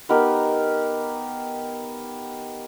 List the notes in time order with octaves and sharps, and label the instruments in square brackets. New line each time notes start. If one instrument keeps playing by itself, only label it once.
[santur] B3 D#4 G4 A#4